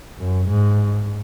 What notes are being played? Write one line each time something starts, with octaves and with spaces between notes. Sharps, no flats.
F#2
G#2